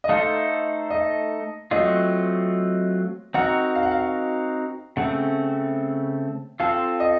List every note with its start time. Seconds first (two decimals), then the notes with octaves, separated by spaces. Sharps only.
0.04 D#5
0.09 A3 D#4 A4 C5 F5
0.90 D#5
1.71 F#3 A3 C4 F4 D#5
3.34 C4 D#4 F#4 A#4 F#5
3.75 F5
3.83 F#5
3.91 F5
4.96 C#3 A3 C4 F#5
6.60 C4 F4 A4 F5
7.00 D#5